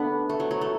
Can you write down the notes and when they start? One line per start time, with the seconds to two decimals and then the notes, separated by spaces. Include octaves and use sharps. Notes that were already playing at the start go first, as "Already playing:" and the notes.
Already playing: B3 D4 A4 F#5 B5
0.30 A3
0.40 F#3
0.51 F#3
0.61 A3